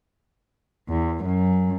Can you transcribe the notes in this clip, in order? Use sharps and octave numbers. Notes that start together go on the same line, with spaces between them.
E2
F#2